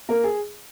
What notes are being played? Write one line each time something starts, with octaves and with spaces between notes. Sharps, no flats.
A#3 A#4
G#4